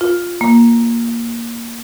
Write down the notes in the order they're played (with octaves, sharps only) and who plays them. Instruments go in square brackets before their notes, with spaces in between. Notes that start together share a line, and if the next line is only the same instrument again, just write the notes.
[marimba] F4
A#3